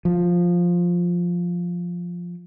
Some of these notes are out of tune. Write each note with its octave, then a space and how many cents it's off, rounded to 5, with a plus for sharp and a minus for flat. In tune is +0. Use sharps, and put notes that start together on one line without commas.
F3 +5